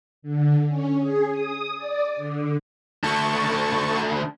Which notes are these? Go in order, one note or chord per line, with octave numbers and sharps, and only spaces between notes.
D3
C#4
G#4
D#6
D5
D3
D3 A3 A5 C#6